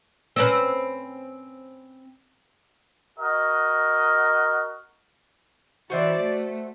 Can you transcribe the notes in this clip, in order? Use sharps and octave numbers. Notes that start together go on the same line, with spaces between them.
C4 C#4 B4
F#4 A#4 D#5
E3 F#4 C5 D5 E5
A3